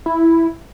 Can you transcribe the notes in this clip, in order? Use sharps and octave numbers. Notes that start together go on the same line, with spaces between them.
E4